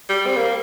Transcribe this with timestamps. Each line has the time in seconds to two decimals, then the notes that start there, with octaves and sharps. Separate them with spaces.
0.09 G3
0.26 C4
0.36 A#3